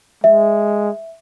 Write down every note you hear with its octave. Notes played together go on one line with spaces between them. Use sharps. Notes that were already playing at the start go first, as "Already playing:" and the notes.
G#3 E5